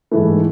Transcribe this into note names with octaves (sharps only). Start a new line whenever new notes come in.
G#2 E3 A3